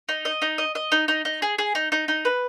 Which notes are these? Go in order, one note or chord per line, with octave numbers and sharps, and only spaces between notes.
D#4
D#5
D#4
D#5
D#5
D#4
D#4
D#4
G#4
G#4
D#4
D#4
D#4
B4